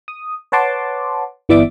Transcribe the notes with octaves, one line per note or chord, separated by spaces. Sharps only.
D#6
B4 C#5 F#5 A5 C6 D6
G1 E3 B3 D5 E5 D6